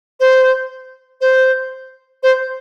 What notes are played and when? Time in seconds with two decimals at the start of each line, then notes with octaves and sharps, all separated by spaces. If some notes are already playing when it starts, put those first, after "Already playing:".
0.20 C5
1.21 C5
2.23 C5